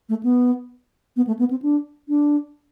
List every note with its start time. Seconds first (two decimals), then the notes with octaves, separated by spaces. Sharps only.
0.09 A3
0.23 B3
1.16 B3
1.27 A3
1.39 B3
1.51 C4
1.62 D4
2.08 D4